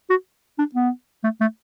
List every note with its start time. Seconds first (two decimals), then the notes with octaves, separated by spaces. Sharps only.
0.10 F#4
0.59 D4
0.75 B3
1.24 A3
1.41 A3